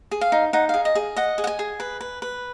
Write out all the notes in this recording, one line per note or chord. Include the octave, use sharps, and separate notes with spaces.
G#4
F5
D#4
D#4 F#5
G#4 F5
D#5
G#4
D#5 F#5
G#4
F#5
G#5
G#4
B4
B4
B4